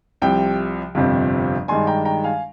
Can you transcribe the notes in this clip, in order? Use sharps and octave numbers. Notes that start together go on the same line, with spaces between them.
C2 C3 F3 G5
G1 F2 C3 F3
G2 D#3 G#3 D4 G#5 C6
G5 A#5
G5 A#5
F5 G#5